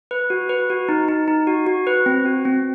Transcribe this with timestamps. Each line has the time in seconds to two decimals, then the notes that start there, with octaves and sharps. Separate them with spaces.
0.11 B4
0.30 F#4
0.49 B4
0.70 F#4
0.89 D#4
1.08 D#4
1.28 D#4
1.47 F#4
1.67 F#4
1.87 B4
2.06 C4
2.26 F#4
2.45 C4